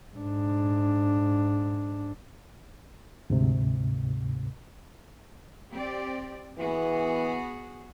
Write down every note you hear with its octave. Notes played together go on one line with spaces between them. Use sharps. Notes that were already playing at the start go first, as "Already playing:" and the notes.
G#2 D4
D2 G#2 C3
C4 G4 D5
E3 B3 F#4 G#4